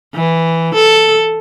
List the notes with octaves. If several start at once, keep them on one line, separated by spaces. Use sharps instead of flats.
E3
A4